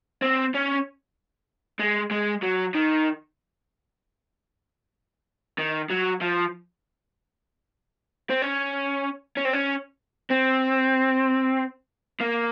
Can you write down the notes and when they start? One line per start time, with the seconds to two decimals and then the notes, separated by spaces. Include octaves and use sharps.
0.22 C4
0.54 C#4
1.79 G#3
2.11 G#3
2.43 F#3
2.74 D#3
5.58 D#3
5.90 F#3
6.21 F3
8.30 C4
8.42 C#4
9.37 C#4
9.45 C4
9.53 C#4
10.31 C4
12.20 A#3